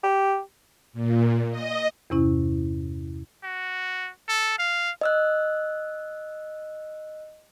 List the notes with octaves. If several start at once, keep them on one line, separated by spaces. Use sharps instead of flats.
G4
A#2
D#5
E2 G2 C3 C#4 E4
F#4
A4
F5
D#5 E6 F#6